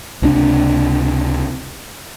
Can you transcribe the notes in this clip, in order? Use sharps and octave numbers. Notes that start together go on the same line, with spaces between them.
C#2 C3 D#3 D4